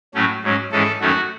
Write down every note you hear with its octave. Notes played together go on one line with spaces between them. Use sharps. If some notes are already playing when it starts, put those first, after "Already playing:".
A2 F#3 A3 C#4
G#2 F#3 C#4
G#2 E3 G#3 C#4 A4
F#2 D#3 A3 C#4 F#4